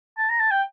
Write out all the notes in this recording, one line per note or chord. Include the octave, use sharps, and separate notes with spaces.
A5
A#5
A5
G5